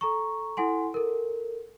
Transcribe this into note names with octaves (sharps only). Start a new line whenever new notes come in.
A4 A#5 C#6
E4 A4 F#5 G#5 C6
A4 A#4